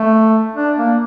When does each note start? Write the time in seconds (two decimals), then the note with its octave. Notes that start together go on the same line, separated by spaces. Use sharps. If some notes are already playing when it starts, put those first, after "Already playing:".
Already playing: A3
0.56 D4
0.77 A#3